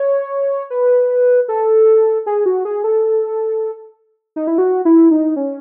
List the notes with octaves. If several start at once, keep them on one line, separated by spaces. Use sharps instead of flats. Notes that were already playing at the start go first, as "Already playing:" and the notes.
Already playing: C#5
B4
A4
G#4
F#4
G#4
A4
D#4
E4
F#4
E4
D#4
C#4